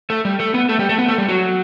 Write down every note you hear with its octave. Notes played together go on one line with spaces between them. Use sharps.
A3 A4
G3 G4
A3 A4
B3 B4
A3 A4
G3 G4
A3 A4
B3 B4
A3 A4
G3 G4
F#3 F#4